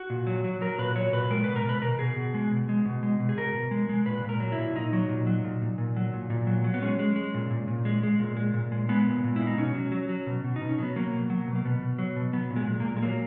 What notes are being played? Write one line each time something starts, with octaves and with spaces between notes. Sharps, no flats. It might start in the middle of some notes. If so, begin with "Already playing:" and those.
Already playing: F#4
A#2
F#3
F#3
F#3 A#4
A#2 B4
F#3 C#5
A#2 B4
G#3 A#4
B2 B4
A#4
B2 B4
B2 A#4
B2 G#4
B2
G#3
B2
G#3
B2
G#3
B2
G#4
B2 A#4
B2
G#3
G#3
A#2 B4
A#2 A#4
F#3
E4
A#2
A#2 D#4
F#3
A#2
F#3
A#2
A#2
A#2
F#3
A#2
A#2
F#3
F#3
B3
G#3 C#4
G#3
G#3
A#2
A#2
A#2
G#3
G#3
A#2
G#3
A#2
G#3
G#3 B3
A#2
A#2
G#3 E4
D#4
B2 C#4
F#3
F#3
F#3
B2
B2
D#4
B2
C#4
F#3 B3
F#3 A#3
B2
F#3
B2
A#3
B2 B3
B2
F#3
B2
F#3 B3
A#2
G#3
A#2
A#2 A#3
G#3
F#3 A#3